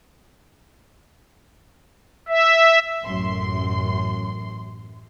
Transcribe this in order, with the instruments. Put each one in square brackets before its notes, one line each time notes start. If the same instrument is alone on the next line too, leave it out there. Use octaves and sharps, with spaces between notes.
[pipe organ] E5
[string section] A1 F#2 C6